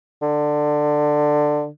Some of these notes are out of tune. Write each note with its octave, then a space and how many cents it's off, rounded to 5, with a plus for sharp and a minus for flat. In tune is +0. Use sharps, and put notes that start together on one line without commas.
D3 +15